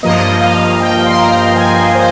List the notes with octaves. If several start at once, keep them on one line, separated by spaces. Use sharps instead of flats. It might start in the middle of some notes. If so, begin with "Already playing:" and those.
G2 F3 A#3 D#5
F5
G5
C6
A#5
G#5
C5